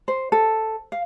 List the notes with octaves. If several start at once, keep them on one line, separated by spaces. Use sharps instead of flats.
C5
A4
F5